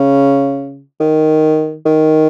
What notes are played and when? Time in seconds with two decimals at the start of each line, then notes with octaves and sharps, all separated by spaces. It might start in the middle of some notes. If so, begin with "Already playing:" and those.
Already playing: C#3
1.00 D#3
1.86 D#3